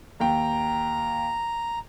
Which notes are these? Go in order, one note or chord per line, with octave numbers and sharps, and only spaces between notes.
D#2 G5 A#5